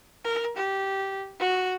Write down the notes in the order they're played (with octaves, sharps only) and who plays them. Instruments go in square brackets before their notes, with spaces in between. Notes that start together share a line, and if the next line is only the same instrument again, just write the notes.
[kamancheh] A#4
G4
F#4